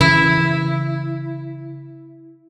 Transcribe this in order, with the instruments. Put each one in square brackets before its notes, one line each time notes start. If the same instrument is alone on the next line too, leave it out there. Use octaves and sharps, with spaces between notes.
[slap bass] C#3 E3 [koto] E4